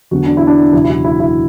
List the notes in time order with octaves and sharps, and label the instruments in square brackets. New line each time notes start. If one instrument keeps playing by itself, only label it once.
[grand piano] E2 D3 F#3 B3 F#4
D4
E4
D4
F#1 E2 B2 E4
E4
F#4
E4
E4